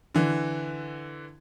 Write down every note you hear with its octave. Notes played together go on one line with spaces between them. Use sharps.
D3 E3